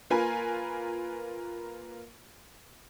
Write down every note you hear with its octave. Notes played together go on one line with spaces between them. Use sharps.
A#3 F4 A#4 B4 G#5